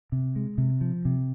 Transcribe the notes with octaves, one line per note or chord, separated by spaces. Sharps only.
C3
G#3
C3
F3
C3